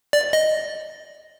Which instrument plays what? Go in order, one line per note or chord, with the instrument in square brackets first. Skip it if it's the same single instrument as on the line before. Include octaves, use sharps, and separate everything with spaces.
[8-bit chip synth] D5
D#5